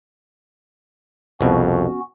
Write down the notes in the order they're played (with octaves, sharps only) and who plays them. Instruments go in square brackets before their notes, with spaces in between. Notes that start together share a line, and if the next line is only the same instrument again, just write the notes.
[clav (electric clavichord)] C2 B2 [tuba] F2 [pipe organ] B3 C#4 F#4